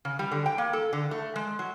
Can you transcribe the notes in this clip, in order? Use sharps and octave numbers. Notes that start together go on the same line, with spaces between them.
C#3
G3
D3
G5
A#3
A4
D3
A3
G#3
F#3